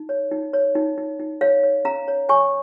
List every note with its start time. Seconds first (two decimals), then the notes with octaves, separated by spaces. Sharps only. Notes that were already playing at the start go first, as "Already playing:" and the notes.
Already playing: D#4
0.09 C#5
0.32 D#4
0.53 C#5
0.75 D#4
0.98 D#4
1.20 D#4
1.41 C#5 F5
1.63 C#5
1.85 C#4 F5 A#5
2.08 C#5
2.29 C#5 G#5 C#6